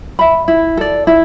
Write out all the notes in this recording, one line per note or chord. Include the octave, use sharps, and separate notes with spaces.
E5 B5
E4
A4 D5
E4